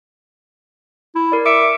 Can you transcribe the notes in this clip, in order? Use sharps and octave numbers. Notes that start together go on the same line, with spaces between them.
E4
A#4 D5
E5 D6 C#7 D7